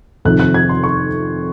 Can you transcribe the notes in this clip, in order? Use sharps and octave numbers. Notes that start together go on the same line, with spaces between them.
F2 C3 D#3 F#6
F#6
G#6
C6
C#6